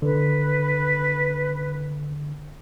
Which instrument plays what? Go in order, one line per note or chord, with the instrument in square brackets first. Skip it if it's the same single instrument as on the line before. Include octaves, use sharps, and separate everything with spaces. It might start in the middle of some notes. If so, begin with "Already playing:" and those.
[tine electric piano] D3 [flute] B4